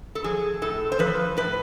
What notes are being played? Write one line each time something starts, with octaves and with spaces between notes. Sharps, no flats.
A4
F3 G#4
A2 A4
C5
F3 B4
A2 B4